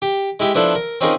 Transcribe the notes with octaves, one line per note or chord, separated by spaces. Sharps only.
G4
G#3 E4 G4
F3 B3 D4 E4 A4 C5
A#4
C4 C#4 D#4 F4 G#4 A#4